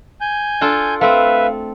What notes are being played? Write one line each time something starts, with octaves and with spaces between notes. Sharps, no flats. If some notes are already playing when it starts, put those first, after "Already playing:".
G#5 G6
D4 F4 A4
A3 C4 B4 E5 F5